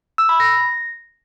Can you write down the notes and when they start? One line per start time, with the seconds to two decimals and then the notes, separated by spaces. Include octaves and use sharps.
0.18 E6
0.29 B5
0.40 A#6